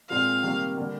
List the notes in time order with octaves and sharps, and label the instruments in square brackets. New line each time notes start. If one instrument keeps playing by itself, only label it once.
[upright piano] A#2 G#3 C4 F4 [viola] F5
[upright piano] C3 D#3 G3 A#3
D3 G3 A#3